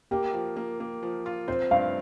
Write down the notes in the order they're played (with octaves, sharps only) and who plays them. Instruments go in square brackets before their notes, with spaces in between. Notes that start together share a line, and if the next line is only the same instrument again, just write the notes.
[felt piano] A#3 [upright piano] G4
[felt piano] F3
A#3
A#3
F3
F4
[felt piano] C4 [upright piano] C5
[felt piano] G2 [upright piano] F5